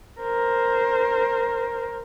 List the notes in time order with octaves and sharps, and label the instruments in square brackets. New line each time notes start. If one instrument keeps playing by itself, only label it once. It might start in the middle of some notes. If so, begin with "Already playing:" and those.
[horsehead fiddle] A#4 C5